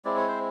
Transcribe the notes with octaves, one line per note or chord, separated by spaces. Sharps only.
G#3 C4 E4 D5
C#5
C5